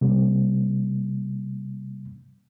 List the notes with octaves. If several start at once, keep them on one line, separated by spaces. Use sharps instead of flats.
C3 G3 A#3